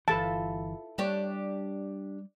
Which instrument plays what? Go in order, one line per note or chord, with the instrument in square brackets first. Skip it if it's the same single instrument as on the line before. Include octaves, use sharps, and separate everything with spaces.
[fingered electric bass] G1 E3 [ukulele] E4 A4 B4 [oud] F4 [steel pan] A5
[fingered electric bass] G3 [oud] D4 G4 C#5